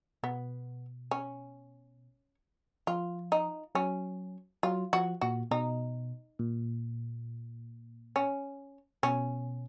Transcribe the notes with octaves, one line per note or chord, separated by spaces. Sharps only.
B2 B3
C#4
F3 F4
D#4
F#3 C#4
F#3 F4
F3 F#4
A#2 F#4
B2 D#4
A#2
C#4
B2 C#4